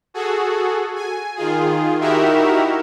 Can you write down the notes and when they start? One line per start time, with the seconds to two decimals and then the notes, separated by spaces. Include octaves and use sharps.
0.14 F#4 G#4 A4
0.95 G#5
1.36 D#3 F4 G#4
2.00 D#4 E4 F#4 G4 A#4 E5